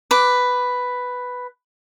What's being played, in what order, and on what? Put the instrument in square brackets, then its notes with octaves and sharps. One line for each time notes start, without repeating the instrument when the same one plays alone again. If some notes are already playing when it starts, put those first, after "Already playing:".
[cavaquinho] B4 D6